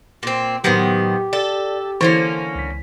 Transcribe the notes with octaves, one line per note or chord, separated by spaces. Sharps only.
A#2 C4
A2 D#3 F#3 B3 G4 C5
A4 D5
D3 E3 A#3 C#4 E4 C5 C6
C#2 B6